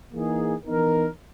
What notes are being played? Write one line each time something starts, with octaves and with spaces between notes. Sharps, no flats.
E3 A#3 D#4 G#4
E3 B3 D#4 A#4